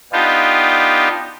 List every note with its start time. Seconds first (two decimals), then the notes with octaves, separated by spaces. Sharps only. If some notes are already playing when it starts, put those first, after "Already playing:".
0.13 B3 D4 D#4 F4 G4